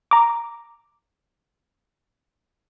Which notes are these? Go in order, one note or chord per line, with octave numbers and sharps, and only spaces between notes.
A#5 D6